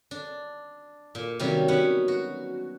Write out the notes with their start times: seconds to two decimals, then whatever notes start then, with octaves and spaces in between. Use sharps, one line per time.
0.11 D4
1.15 A#2
1.39 C3 D#3 F#3 G3 C#4
1.68 B3 C#4 F#5
2.08 F#4